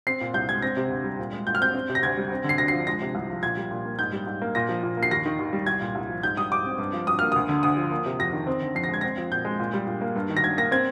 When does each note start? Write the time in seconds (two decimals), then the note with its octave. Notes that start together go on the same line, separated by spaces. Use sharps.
0.07 C4 C7
0.21 A#2
0.34 C2 G6
0.49 G#3 G#6
0.62 C4 A#6
0.77 C3
0.90 D2
1.04 G3
1.19 A#2
1.33 G#3
1.47 A#2 G6
1.55 F6
1.60 C4 G6
1.74 C4
1.89 C3
1.95 A#6
2.03 D2 G#6
2.17 G3
2.31 C4
2.44 D3
2.49 C7
2.58 D2 A#6
2.68 C7
2.73 F3
2.87 G#3 A#6
3.01 C3
3.15 C2
3.29 F3
3.43 A#2 G#6
3.57 G3
3.71 A#2
3.85 A#3
3.99 G#2 G6
4.13 G3
4.27 G#2
4.42 A#3
4.55 A#2 A#6
4.69 F3
4.83 A#2
4.97 A#3
5.03 C7
5.11 D#2 A#6
5.26 D#3
5.39 D#2
5.53 G3
5.66 C2 G#6
5.81 A#2
5.95 C2
6.09 F3
6.23 G#2 G6
6.37 G3 D#6
6.51 G#2 D6
6.65 C4
6.79 G2
6.93 F3
7.07 G2 D#6
7.19 A#3 F6
7.32 D2 D#6
7.49 D3
7.63 D2 D#6
7.77 F3
7.91 A#3
8.06 C3
8.19 F2 A#6
8.33 D#3
8.47 C4
8.61 D3
8.75 F2 C7
8.84 A#6
8.89 G#3 G#6
9.01 C4 A#6
9.18 F3
9.32 A#2 G6
9.45 G#3
9.59 A#2
9.74 G3
9.87 A#2
10.01 A#3
10.16 G2
10.30 D#3
10.37 A#6
10.43 G2 G#6
10.58 A#3 A#6
10.71 C4 G#6